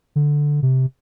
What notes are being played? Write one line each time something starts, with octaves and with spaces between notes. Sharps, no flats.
D3
C3